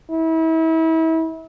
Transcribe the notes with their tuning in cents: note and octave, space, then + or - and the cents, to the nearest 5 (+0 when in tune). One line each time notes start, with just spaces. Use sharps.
E4 -35